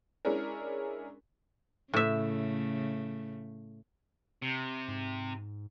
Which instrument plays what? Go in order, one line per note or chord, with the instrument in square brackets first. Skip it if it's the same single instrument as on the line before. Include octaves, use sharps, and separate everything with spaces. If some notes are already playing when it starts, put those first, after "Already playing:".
[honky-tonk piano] G#3 C#4 D4 E4 G#4 A#4
[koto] A2 E5 [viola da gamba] C#3 A3
[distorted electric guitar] C3
[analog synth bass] G#2